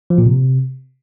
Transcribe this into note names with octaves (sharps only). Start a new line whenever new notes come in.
F3
A#2
C3